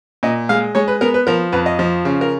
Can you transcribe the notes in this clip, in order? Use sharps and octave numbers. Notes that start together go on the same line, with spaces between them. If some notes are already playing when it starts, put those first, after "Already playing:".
A#2 D#5
G#3 F5
G#3 C#5
B4
B3 A#4
B4
F3 A#4
F2 B4
D#5
F3
C#3
A#4